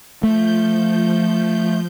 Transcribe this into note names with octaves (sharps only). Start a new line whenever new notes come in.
F3 A3 G6